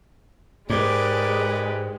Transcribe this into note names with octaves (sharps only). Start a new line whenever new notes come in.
G#2 G#3 G4 A#4 B4 D5